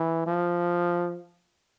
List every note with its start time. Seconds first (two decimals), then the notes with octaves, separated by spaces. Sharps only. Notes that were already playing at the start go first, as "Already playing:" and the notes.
Already playing: E3
0.26 F3